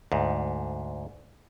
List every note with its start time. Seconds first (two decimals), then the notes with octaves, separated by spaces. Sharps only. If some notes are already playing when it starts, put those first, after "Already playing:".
0.12 D2 G#2